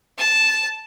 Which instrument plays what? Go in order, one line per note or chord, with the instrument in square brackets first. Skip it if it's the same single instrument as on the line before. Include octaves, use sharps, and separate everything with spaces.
[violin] A5